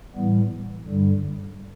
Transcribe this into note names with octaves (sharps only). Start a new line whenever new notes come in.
A2 E3 G3 B3
G2 D3 G3